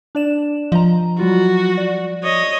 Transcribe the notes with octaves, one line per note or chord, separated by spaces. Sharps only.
D4 D5 E7
F3 D#5 A#5
F#3 G3 F4 F#4
D5
C#5 D#5